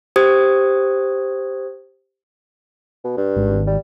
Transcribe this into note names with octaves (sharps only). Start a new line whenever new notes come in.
G4 C5 D#6 G#6
B2
G2
G#1
G3